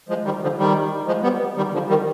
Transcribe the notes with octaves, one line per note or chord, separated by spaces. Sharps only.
F3 G#3
D#3 G3
D3 F3
D#3 G3
F3 G#3
G3 B3
D#3 G3
D3 F3
D#3 G3